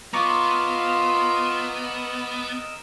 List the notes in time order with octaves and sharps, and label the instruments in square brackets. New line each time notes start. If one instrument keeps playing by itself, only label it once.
[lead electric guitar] B3 [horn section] F4 [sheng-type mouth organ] A#4 D#5 E6 [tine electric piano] A#5 C#6 D6